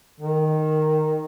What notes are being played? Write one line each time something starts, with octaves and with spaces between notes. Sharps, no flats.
D#3